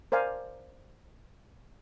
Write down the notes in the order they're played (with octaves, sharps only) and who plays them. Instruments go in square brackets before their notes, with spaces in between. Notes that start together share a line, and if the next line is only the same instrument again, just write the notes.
[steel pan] A#4 C5 D5 F5 G#5